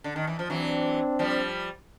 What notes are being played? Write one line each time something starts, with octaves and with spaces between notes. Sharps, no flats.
D3
D#3
E3
F3
E3 F#3 C4 D4
F3 G3